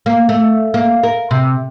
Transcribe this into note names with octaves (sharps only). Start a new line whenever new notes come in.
A#3
A3
A#3
A#4
C3